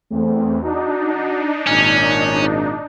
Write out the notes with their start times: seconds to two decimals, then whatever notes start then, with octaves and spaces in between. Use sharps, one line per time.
0.11 E2 A3 C4
0.63 D4 D#4 F#4
1.67 G#1 A#2 C#4